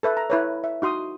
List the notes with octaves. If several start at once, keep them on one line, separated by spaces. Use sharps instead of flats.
A4 B4 E5
A#5
E4 B4 C#5
E5
D#4 F#4 C6 D#6